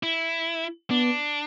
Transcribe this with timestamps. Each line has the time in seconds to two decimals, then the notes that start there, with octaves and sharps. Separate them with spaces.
0.03 E4
0.91 B3 D4